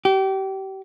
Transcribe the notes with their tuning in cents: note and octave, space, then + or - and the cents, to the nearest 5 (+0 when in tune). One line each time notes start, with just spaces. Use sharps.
G4 -30